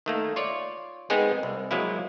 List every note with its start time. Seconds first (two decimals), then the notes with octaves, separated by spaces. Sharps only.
0.06 D#3 A3 A#3
0.36 F4 C#5 D5
1.10 G#3 B3 C4 D#4 G#4 A#4
1.43 C2
1.71 F3 F#3 G#3 A#3 E4